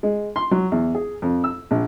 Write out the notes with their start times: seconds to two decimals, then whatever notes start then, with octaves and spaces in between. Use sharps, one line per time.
0.03 G#3
0.36 C6
0.51 F#3
0.72 E2
0.95 G#4
1.22 F2
1.44 E6
1.71 A#1